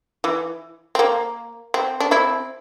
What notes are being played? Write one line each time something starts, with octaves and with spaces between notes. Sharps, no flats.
E3
C4
A#3
C4
D4
C4 E4